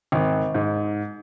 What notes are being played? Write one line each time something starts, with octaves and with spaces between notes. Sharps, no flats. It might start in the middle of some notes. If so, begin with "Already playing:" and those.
G#1
G#2